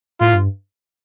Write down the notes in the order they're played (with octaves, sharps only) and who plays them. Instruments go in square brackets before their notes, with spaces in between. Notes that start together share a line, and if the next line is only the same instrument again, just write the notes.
[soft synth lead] A2 [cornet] F4
[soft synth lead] G2